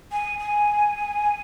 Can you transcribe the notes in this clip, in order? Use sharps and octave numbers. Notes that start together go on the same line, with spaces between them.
G#5
G#5